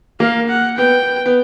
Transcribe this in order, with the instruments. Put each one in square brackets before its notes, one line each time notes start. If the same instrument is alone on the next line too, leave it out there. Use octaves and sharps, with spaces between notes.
[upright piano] A#3 [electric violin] F5
[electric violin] F#5
[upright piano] B3 [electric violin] G5
[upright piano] B3